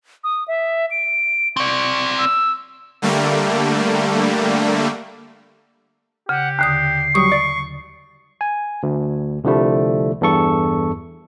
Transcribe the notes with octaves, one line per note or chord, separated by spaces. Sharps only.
D#6
E5
D7
C4 D5 C#6
E6
D3 G3 A3 A#3
C#3 G4 F#5
D#2 D3 D#6 C7
F#3 G3 C#6 D#6
D5
G#5
D2
C2 D3 F3 G3 A3
E2 G2 A4 C#6